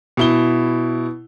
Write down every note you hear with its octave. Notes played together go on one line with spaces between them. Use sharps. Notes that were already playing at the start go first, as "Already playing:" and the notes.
B2 E4 G7